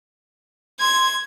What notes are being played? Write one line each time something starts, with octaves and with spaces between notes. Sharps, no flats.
C6 G#6